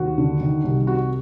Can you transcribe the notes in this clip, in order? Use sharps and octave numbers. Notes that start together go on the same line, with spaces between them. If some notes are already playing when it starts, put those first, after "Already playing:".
Already playing: D#2 F#4
D3
D#3
C2
C3 F#4